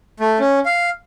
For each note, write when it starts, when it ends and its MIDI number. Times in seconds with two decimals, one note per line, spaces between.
0.20 0.38 57
0.40 0.59 61
0.66 0.89 77